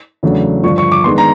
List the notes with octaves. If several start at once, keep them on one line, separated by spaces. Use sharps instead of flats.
E2 C#3 F#3 A3 D4
G2 D3 F3 C#6
C#6
D6
D#3 G#3 B3 D4 C6
A#5